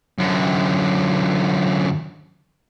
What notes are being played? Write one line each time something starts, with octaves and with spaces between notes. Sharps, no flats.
F#2 D3